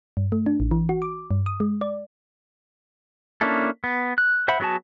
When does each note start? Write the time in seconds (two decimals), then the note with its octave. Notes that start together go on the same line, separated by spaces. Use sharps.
0.17 G2
0.32 A3
0.46 D4
0.60 A1
0.71 E3
0.89 F#4
1.02 D6
1.31 G2
1.46 D#6
1.60 G#3
1.81 D5
3.41 A#3 C#4 D4 E4 A4
3.84 B3
4.18 F#6
4.48 C5 E5 F#5 B5
4.60 F#3 B3 F#4 G#4 A5